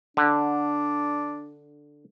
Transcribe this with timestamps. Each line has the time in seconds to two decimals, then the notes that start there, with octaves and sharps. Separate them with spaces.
0.17 D3 D4